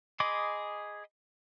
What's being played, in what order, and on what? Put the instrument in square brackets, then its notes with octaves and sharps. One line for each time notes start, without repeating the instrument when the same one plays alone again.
[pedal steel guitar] G#4 D#5 B5 C6 D6